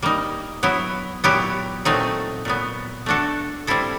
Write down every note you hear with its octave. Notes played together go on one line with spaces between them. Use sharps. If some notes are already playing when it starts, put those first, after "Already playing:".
G3 A#3 D#4
F#3 B3 E4
A#2 F#3 B3 E4 G4
A#2 F#3 A3 C4 D#4
A#2 F#3 B3
A3 D4 F#4 A4
G3 C4 E4 A4